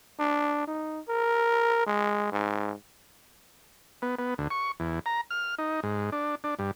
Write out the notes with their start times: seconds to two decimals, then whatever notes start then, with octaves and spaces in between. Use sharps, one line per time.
0.19 D4
0.67 D#4
1.08 A#4
1.86 G#3
2.32 G#2
4.02 B3
4.19 B3
4.38 D2
4.50 C#6
4.80 E2
5.06 A#5
5.31 F6
5.58 D#4
5.83 G#2
6.12 D4
6.44 D4
6.59 G2